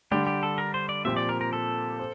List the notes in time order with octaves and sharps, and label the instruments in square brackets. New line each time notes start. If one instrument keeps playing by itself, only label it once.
[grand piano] D3 G3 D4 [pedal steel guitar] G4
[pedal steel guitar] G4
A4
A#4
C5
D5
[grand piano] A#2 F3 C4 G4 [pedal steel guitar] E5
[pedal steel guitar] D5
A#4
A#4
A4
[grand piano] C5